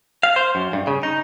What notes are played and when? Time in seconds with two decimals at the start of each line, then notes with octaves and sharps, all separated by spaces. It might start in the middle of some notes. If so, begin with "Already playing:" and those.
0.23 F5
0.36 C5
0.55 F#2
0.73 G2
0.87 C#3
1.03 D#4